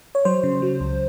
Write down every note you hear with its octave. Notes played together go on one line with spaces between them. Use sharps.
C#5
F#3 C5
C#3
F#3
C#2